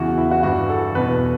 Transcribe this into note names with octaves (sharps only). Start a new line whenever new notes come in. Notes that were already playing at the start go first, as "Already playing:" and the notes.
Already playing: E2 C#3 E3 F#4
E4
F#4
G2 E3 F#4
A4
E2 B2 B4